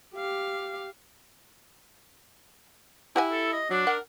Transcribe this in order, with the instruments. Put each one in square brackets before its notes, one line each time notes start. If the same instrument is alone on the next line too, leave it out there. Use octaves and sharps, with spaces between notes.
[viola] G4 F5
[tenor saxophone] E4 [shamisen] G4 F#5 G#5
[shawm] A4
D#5
[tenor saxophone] F#3 [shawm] D4
[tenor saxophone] A#4 [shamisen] F#5